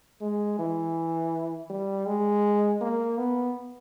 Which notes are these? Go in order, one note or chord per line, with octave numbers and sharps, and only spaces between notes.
G#3
E3
G3
G#3
A#3
B3